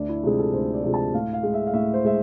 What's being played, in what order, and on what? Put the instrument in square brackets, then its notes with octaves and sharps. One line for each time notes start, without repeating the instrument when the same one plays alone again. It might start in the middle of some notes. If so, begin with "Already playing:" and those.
Already playing: [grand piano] D2 D4
E4
C3 F3 G#3 G#4
A4
D2 C5
D5
C3 F3 G#3
A5
A2 F5
F5
G#3
E5
F5
A2 E5
C5
G#3 E5